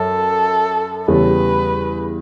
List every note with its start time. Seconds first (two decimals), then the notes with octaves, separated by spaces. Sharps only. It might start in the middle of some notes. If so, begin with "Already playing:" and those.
Already playing: F#2 A4
1.08 E2 C#3 G3 B4